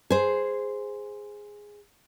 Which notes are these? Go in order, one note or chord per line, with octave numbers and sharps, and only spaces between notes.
G#4 C5